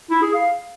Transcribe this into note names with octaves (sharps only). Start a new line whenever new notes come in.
E4
G#4
F5